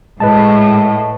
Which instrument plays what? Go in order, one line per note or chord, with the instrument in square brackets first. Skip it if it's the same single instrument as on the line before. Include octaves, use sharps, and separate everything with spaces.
[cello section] A2 [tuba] G#3 [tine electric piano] B4 D#5 A5